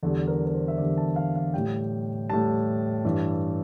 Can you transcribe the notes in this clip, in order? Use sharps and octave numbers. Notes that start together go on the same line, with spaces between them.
E2 D3 G3 A4
A#4
A#4
C5
E5
E2 D3 G3 D5
A5
F5
F5
A2 G3 G5
A2 G3 A5
G2 E3 G3